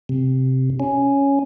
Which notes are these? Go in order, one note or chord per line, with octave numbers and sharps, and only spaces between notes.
C3
C#4